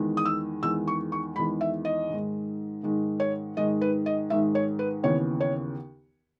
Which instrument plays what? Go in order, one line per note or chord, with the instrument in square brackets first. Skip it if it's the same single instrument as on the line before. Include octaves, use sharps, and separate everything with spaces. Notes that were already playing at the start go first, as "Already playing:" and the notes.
Already playing: [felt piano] E2 D#3 G#3
D#6
E6
E2 D#3 G#3 E6
C#6
C#6
E2 D#3 G#3 B5
E5
D#5
G#2 D#3 G#3
G#2 D#3 G#3
C#5
G#2 D#3 G#3 D#5
B4
D#5
G#2 D#3 G#3 E5
C#5
B4
D#2 C#3 E3 B3 C#5
C#5